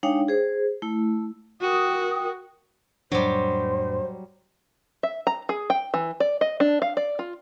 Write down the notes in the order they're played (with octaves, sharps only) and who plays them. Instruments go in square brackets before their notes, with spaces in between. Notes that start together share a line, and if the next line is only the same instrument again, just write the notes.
[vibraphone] G#3 D4 D#4 C#5 F5 G5
G#4 C5
A3 E4
[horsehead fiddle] F#4 [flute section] A#4 G5 D#6
[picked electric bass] F2 A2 D4 [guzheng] F#3 G3 [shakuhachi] C5
[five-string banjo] E5
A#5
G#4
G5
E3
D5
D#5
D4
F5
D5
F4